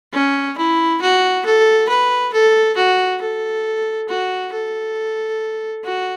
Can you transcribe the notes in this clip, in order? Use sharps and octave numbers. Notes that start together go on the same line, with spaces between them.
C#4
E4
F#4
A4
B4
A4
F#4
A4
F#4
A4
F#4